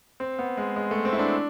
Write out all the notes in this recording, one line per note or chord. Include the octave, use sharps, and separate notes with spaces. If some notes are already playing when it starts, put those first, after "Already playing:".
C4
B3
G#3
G#3
A3
C4
E4
D4